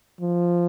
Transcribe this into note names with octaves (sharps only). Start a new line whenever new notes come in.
F3